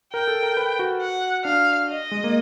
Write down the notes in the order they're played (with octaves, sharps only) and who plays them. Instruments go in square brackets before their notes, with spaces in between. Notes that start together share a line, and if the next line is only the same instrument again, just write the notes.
[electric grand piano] A#4 [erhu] G5
[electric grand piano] A4
A#4
B4
F#4
[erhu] F#5
[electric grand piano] D4 [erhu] F5
[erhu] D#5
[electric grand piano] G#3
A#3